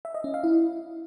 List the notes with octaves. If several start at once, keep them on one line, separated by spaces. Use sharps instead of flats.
E5
D#5
C#4
F5
E4